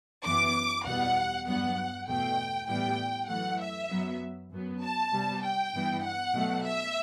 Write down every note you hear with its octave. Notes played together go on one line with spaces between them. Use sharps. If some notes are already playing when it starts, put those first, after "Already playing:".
F#2 E3 B3 D6
E2 B2 G3 B3 F#5
G2 F#3 B3 F#5
E2 B2 A3 G5
A2 E3 G3 B3 G5
F#2 E3 A3 F#5
E5
F#2 F#3 B3
F#2 F#3 B3
A5
C3 G3 B3
G5
G2 E3 B3
F#5
B2 F#3 A3
E5